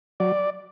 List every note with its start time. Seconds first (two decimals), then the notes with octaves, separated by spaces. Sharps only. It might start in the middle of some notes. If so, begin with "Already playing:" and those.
0.20 F#3 D5